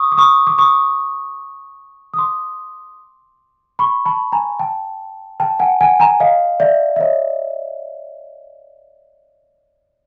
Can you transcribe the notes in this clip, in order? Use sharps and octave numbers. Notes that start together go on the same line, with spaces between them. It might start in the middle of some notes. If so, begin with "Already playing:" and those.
Already playing: C#6 D#6
D6
C#6 D#6
D6
C#6 D#6
D#6
C6 D6
B5 C#6
A5 B5
G#5 A#5
G5 A5
G5 A5
F#5 G#5
F#5 G#5
G#5 A#5
D#5 F5
D5 E5
E5
C#5 D#5